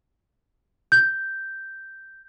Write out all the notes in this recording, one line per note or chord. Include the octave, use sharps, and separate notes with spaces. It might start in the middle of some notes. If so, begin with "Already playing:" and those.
G6